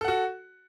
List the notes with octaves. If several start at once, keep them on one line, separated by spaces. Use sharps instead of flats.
F#4 A4 F#5